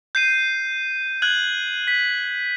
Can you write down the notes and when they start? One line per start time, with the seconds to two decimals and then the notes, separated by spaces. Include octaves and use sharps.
0.15 G6 C7 D#7
1.22 F#6 G#6 F#7
1.88 B6